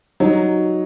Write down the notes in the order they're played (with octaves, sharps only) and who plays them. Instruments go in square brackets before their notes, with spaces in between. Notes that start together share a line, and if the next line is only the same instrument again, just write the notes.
[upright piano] F#3 [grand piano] D#4